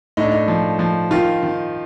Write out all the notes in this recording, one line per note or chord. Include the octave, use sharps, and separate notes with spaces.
A2 D#4
D4
D#4
F3
F3
D#3 F4
D#3